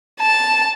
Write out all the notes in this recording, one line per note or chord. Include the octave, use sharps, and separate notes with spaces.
A5